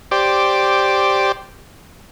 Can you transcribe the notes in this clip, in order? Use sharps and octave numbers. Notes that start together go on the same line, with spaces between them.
G4 C5 D5